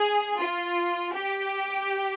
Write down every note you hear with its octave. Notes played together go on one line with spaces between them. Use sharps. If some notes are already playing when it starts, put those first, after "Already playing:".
Already playing: G#4
F4
G4